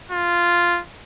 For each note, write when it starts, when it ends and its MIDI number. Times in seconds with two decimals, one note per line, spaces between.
0.12 0.80 65